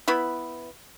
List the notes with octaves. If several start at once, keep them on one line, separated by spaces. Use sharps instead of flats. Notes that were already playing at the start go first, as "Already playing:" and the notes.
B3 E4 B5